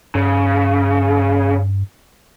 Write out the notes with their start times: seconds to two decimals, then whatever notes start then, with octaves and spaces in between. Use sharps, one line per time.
0.15 G2 C#3